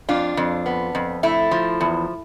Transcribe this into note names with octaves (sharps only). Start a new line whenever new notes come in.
F2 D4 F4
F2
B3
F2
A3 E4
F3
E2